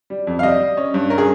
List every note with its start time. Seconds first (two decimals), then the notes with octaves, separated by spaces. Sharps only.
0.10 G3
0.27 F2
0.39 F5
0.43 G3 D#5
0.60 G3
0.77 C#4
0.94 G2
1.10 C#4 A#4
1.18 G#4